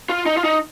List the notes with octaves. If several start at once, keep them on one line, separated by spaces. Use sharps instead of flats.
F4
D#4
F4
D#4